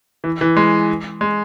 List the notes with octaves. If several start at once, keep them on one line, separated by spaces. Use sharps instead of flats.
E3
E3
G#3
G#3